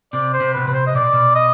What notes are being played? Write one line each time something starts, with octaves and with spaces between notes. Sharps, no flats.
C3 D5
C5
C3
B2 B4
C3 B4
C5
D#5
B2 D5
B2
D#5